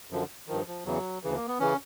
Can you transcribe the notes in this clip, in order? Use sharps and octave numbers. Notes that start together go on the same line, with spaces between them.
F#2 D3 F3
G2 D#3 F3
F3
E2 C#3 E3 F#3
D2 C#3 E3
A#3
B3
C#3 E3 C#4